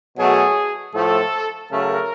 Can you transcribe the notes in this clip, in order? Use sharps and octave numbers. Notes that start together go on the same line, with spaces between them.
B2 F#3 A3 G#4
A2 F3 A3 A4
C#3 F#3 A3 A#4